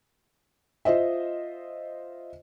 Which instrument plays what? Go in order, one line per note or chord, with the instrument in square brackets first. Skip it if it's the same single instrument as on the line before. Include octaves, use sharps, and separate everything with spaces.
[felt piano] F4 C5 D#5 E5